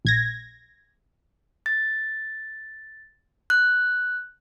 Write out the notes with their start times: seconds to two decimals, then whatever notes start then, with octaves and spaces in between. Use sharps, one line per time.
0.05 A#1 G#6 A#6
1.66 A6
3.50 F#6